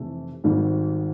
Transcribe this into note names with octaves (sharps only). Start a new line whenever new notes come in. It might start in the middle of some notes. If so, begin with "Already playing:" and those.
Already playing: F1 C3 E3 A3
G#1 G#2 D#3 G3